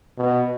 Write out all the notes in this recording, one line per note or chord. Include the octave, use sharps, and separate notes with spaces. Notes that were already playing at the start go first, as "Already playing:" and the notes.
B2